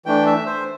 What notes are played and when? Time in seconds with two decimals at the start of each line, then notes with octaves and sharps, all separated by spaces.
0.06 E3 A3 D4 G5
0.26 E5
0.46 C5